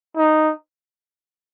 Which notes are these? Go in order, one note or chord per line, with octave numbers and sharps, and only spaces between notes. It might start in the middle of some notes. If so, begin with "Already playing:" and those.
D#4